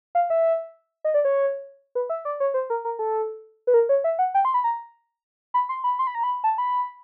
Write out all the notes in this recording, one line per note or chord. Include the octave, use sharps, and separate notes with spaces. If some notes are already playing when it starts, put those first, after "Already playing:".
F5
E5
D#5
D5
C#5
B4
E5
D5
C#5
C5
A#4
A#4
A4
B4
A#4
C#5
E5
F#5
G5
C6
B5
A#5
B5
C6
B5
C6
B5
A#5
B5
A5
B5